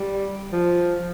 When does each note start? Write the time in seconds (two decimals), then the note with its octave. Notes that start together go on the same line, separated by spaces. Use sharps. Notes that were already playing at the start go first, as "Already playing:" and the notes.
Already playing: G3
0.52 F3